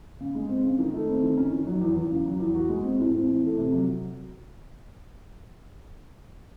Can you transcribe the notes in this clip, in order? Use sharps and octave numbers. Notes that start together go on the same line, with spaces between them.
C#3
G#3
C4
C#3
D#3
A3
C4
D#3
C#4
D#3
F#3
E2
E2
C#3
F#3
E2
F#4
G#3
C4
A2
C4
E3
A3
C3
F#3